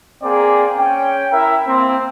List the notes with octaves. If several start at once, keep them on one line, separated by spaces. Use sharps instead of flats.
A#3 C4 G#4 D5 G5
C#4 G5
E4 A#4 E5
A#3 C4